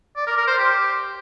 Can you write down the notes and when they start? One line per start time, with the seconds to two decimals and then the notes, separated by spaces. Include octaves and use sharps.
0.16 D5
0.27 A#4
0.37 A#4
0.47 C5
0.58 G4